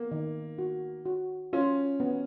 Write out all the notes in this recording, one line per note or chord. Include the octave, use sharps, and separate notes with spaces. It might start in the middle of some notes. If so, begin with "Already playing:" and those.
Already playing: A#3 B3
D#3
F#4
F#4
C#4 F4
B3